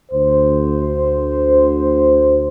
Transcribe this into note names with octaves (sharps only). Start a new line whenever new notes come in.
D2 C5